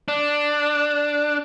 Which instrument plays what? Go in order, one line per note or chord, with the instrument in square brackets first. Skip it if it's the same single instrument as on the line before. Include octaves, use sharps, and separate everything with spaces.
[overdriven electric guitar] D4